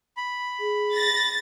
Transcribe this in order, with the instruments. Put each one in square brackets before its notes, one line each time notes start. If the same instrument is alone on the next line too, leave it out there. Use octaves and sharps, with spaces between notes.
[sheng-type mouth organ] B5
[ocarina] G#4
[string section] A6 A#6